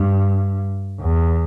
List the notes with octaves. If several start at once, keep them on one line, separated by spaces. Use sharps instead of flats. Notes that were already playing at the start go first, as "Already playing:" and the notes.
Already playing: G2
E2